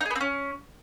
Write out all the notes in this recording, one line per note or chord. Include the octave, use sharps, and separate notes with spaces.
D#4
G#4
B3
C4
C#4